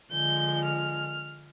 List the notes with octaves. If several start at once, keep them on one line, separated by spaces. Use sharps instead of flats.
D3 F3 G#3 G6
F6